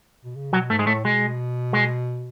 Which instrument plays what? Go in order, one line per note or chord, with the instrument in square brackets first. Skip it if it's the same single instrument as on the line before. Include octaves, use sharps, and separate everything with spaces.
[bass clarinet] B2
C#3
[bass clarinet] B2 [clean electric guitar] F#3
[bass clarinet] G#2 [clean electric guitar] A3
[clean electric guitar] G#3
[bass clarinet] A2 [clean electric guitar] A3
[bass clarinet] B2 [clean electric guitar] G#3
[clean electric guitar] G#3